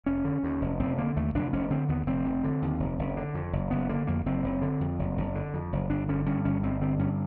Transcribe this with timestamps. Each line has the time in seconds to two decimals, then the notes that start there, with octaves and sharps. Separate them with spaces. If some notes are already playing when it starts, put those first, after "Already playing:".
0.06 F1 C#4
0.25 D3
0.43 D#2
0.62 F1
0.79 F1 C4
0.98 D3 A#3
1.16 D#2 A3
1.34 F1 D4
1.53 F1 C#4
1.70 D3 C4
1.88 D#2 B3
2.07 F1 C4
2.25 F1
2.44 D3
2.62 D#2
2.80 F1
2.99 F#1
3.17 D3
3.34 F2
3.53 F#1
3.71 F#1 B3
3.89 D3 A#3
4.07 F2 A#3
4.26 F#1 C4
4.44 F#1
4.62 D3
4.80 F2
4.99 F#1
5.17 F#1
5.35 D3
5.54 F2
5.73 F#1
5.90 G1 D4
6.09 D3 C#4
6.26 G2 C#4
6.45 G1 C#4
6.63 G1 C4
6.81 D3 C4
6.99 G2 C#4